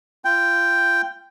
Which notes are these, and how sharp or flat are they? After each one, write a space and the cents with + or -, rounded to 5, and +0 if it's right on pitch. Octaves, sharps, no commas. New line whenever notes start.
F4 -25 G5 +0